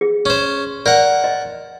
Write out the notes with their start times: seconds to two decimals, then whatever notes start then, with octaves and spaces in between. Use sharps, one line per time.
0.01 G#4
0.26 C#4 C5
0.86 A#4 D5 F#5
1.24 D#5